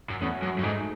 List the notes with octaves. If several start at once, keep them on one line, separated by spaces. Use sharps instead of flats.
F#2
E2 A3 C#4 F#4
F#2
F#2
G#2 A3 D#4 G#4